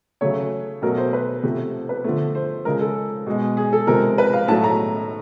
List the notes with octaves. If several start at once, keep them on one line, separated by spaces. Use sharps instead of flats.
C#3 F#3 A3 C#5
B2 F#3 A3 A#4
C5
B4
C3 F3 A3
B4
D3 F3 A3
C5
C#3 F3 G#3 A#4
A4
B2 G#3
G#4
A4
C3 F3 G#3 A#4
B4
F5
A2 F#3 A3 A5
A#5